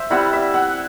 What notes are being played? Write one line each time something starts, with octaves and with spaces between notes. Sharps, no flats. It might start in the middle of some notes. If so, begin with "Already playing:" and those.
Already playing: C5 E5
G3 C4 E4 F#5
E5
F#5